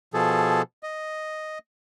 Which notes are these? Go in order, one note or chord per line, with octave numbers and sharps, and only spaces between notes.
B2 F3 G#4 A4
D#5